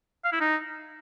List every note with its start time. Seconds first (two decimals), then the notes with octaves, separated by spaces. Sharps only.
0.25 F5
0.33 E4
0.40 D#4